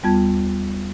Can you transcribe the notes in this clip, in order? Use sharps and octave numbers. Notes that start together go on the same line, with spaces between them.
D#2 G3 B3 F4 A5 G#6